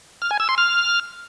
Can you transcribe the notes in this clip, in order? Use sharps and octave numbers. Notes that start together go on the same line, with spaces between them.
F6
G#5
E6
C6
F6